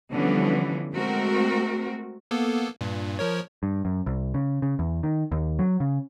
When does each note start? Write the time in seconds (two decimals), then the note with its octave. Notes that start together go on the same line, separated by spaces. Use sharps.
0.14 D3 E3 F3 G3 B3 C#4
0.93 G#3 A3 C4 F#4 A#4
2.31 A#3 B3 A4
2.81 G2 A#2
3.19 F3 A#4 C#5
3.63 G2
3.85 F#2
4.06 C2
4.34 C#3
4.62 C#3
4.79 E2
5.03 D#3
5.32 D#2
5.59 F#3
5.80 C#3